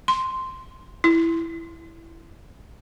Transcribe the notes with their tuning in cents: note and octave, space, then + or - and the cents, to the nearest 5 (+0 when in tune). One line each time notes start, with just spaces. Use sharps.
C6 -5
E4 +5